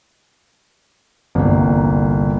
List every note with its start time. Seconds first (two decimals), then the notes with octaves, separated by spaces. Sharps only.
1.35 G1 C2 A#3